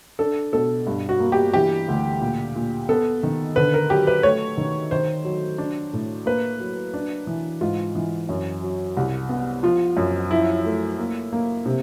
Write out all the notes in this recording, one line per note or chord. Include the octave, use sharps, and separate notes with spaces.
D4 A4
B2 A4
G2
F#4
A#3
G4
E3 G4
D2
A#2
A#2
B3 A4
D#3
D3 B4
A#4
F#3 G4
B4
A3 C#5
D#3
D#3 C5
F#3
D4
A2
A#3 B4
F#3
D4
E3
G#2 F4
E3
F#2
F#3
C2
B3
F3 F4
F#2
F3 E4
A3
A#3
A#3
C3